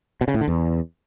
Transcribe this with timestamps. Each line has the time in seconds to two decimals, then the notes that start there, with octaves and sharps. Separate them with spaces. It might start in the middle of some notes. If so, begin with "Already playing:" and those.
0.21 B2
0.28 C#3
0.34 A2
0.41 D3
0.48 E2